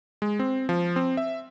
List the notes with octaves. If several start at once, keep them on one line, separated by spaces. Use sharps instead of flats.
G#3
C4
F3
C4
E5